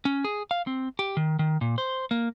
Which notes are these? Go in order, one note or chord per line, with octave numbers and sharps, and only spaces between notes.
C#4
G#4
F5
C4
G4
D#3
D#3
A#2
C5
A#3